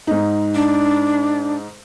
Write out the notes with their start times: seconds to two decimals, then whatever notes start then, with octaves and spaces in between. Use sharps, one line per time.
0.07 G#2 D#4
0.55 D4